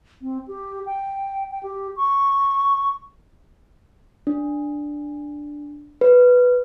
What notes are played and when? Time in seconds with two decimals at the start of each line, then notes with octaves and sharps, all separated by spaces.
0.22 C4
0.48 G4
0.86 G5
1.51 G5
1.63 G4
1.96 C#6
4.27 D4
6.01 B4